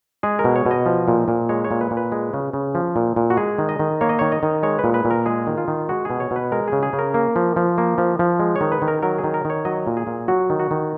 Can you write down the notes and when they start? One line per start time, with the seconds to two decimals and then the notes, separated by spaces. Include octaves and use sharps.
0.23 G#3 G#4
0.39 A#4
0.44 B2
0.56 C#5
0.66 B2
0.71 D#5
0.86 F3
1.08 A#2
1.28 A#2
1.49 G#3 C#5
1.64 C#5
1.71 A#2
1.81 B4
1.91 A#2
1.97 B4
2.12 G#3
2.34 C#3
2.53 C#3
2.75 F3
2.96 A#2
3.16 A#2
3.30 F#4
3.37 G#3 G#4
3.58 D#3
3.69 D#5
3.80 D#3
4.01 A#3 C#5
4.09 D#5
4.19 D#3 C#5
4.32 D#5
4.43 D#3
4.63 G#3 C#5
4.79 B4
4.84 A#2
4.94 B4
5.05 A#2
5.11 A#4
5.26 G#3 G#4
5.47 D#3
5.58 F4
5.68 D#3
5.89 G#3 F#4
6.05 B2 G#4
6.20 C#5
6.31 B2
6.36 B4
6.52 G#3 A#4
6.68 C#3 G#4
6.83 G#4
6.93 C#3
6.99 A#4
7.14 A#3
7.36 F3
7.56 F3
7.78 A#3
7.98 F3
8.19 F3
8.40 G#3
8.56 C#5
8.61 D#3
8.72 B4
8.82 D#3
8.88 A#4
9.02 F#3 A#4
9.18 G#4
9.24 D#3
9.34 A#4
9.45 D#3 C#5
9.65 F#3 D#5
9.87 A#2
9.97 G#4
10.07 A#2
10.28 F#3 F#4
10.50 D#3
10.59 F#4
10.71 D#3